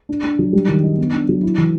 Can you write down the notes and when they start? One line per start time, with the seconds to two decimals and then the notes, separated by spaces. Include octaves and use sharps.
0.09 D4
0.24 D4
0.39 F#3
0.53 G3
0.68 D#3
0.84 D#4
0.98 B3
1.13 D4
1.29 F#3
1.43 E4
1.58 E3